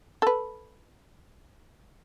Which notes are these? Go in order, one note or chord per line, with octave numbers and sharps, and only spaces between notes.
A4 B4